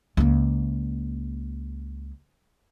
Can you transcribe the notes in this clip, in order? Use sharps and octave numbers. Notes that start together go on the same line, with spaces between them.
C#2 A#3